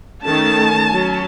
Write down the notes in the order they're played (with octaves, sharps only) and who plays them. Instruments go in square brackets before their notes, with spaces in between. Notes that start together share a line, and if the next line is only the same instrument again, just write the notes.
[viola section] D#3 A3 C#4 A5
F#3 C#4